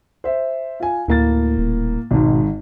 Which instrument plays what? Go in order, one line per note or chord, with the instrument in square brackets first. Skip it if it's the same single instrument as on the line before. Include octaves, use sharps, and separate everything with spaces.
[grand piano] C5 E5
F4 G#5
[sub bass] D2 [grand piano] A2 A#3 A6
[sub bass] D#1
[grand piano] G#1 G#2 [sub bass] B2